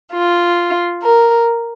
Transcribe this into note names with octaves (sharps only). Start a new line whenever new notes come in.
F4
A#4